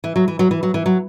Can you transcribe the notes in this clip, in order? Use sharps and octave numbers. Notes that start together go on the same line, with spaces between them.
E3
F#3
E3
F#3
E3
F#3
E3
F#3